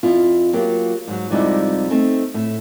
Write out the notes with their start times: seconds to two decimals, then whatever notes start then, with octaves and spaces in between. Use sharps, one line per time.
0.03 F2 E4 F4
0.53 F#3 A#3 F4 G4
1.07 G#2 F#3
1.30 F2 C3 G3 G#3 D#4 E4
1.91 A3 C4 D#4
2.34 A2 E5